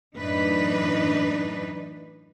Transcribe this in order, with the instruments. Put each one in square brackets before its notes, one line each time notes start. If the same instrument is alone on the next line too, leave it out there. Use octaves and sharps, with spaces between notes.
[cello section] F#2 A2 E3 D4 D#4 B4